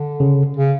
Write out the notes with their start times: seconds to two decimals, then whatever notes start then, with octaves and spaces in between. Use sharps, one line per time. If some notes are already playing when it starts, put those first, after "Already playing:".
Already playing: D3
0.20 C#3
0.57 C#3